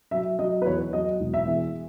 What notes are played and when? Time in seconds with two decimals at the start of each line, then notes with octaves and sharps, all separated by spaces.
0.11 F#3 E5
0.39 F#3 D#5
0.62 B4
0.66 E2 C#5
0.93 F#3 D#5
1.20 E1
1.34 E5
1.47 E2